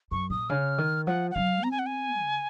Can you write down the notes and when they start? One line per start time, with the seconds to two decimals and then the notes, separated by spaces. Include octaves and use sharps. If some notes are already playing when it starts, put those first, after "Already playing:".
0.11 F#2 C#6
0.30 A#2 D#6
0.50 C#3 F6
0.78 D#3
1.07 F3 F#5
1.31 F#5
1.35 F#3 F5
1.63 C4 A#5
1.71 G#5
1.79 F#5
1.86 G#5
2.21 C#3